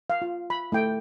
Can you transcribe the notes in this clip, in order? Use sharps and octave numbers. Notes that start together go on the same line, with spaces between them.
F5
F4
B5
A3 E4 G5